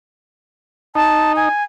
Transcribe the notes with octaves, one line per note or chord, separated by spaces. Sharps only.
D#4 A5
G#5